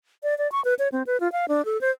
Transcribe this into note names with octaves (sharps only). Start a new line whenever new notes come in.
D5
D5
C#6
B4
C#5
C4
B4
F4
F5
D4
A4
C5